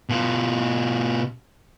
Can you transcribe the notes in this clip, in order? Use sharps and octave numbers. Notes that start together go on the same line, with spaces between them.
B2 F4